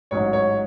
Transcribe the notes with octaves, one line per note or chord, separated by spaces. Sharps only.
A1 G#2 F#3 C#5
C#5